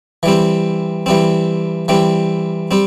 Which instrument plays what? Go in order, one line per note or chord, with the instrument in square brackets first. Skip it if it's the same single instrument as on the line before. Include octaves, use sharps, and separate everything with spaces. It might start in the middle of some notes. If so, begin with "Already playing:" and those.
[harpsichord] E3 G3 C4
E3 G3 C4
E3 G3 C4
G3 C4